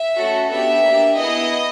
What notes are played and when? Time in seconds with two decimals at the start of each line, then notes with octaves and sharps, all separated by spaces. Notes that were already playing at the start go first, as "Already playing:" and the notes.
Already playing: E5
0.15 A3 C#4 F#4 A4
0.50 B3 D4 G4 E5
0.83 A#3 D4 G4
1.17 B3 E4 G#4 D#5